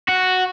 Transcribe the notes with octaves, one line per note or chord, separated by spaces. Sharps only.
F#4